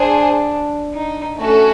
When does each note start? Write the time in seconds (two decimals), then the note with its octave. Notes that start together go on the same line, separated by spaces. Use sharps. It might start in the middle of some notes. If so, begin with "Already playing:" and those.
Already playing: D4 G#4 C5
0.94 D#4
1.37 A3 C#4 F#4 A4